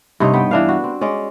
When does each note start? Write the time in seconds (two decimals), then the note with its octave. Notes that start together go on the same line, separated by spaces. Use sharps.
0.20 G2 C3 D#4 C#5
0.34 B3 G5
0.51 E3 D4 F5
0.69 F#4
0.84 C4
1.01 G#3 C#4 D5